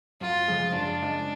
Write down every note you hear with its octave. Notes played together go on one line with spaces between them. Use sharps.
F#2 F4
C#3 F3 G#3
F#2 D4
C#3 F3 G#3